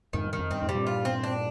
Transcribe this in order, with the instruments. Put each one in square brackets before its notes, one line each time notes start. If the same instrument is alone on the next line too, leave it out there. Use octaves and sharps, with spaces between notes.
[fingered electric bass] F2 G#2 [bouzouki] D#3
[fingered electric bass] G2
[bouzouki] D#3
[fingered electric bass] F2
[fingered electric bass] G2 [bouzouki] C4
[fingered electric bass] F2 G#2
[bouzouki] G3
[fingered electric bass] G2 A#2
[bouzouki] F4
C4
D4